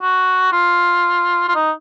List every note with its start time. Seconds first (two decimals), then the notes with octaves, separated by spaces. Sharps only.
0.02 F#4
0.52 F4
1.49 F4
1.55 D#4